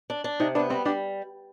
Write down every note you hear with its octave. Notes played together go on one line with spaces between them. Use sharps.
D4
D4
C3 D#4
B3 D4
G3 C4
G3 D4